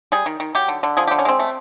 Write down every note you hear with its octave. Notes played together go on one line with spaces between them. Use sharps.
G3 G#4
D#3
D#3
F#3 G4
D3
D3
F3 G#4
G4
D3
C#4
G#3 C4
A3